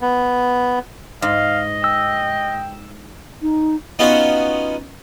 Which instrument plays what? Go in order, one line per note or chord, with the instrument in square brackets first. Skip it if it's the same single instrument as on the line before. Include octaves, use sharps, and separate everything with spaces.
[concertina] B3
[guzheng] G#2 [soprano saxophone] D#5 [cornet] F5
[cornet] G5 [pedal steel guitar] E6
[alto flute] D#4
[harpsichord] B3 C#4 D#4 F4 F#4